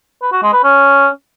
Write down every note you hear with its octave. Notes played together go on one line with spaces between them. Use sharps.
B4
F#4
G#3
B4
C#4